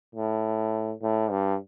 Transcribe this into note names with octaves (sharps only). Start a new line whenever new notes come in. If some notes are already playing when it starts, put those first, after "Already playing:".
A2
A2
G2